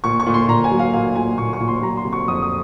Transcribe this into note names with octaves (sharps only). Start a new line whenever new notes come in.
A#2 C#6
C#6
A#2
C6
A#2 A#5
G#5
F#3
F5
A#2 F5
A#2 G#5
A#2 C#6
C#6
A#2
C6
F#3 A#5
C6
C3
C#6
F2 D#6
D#6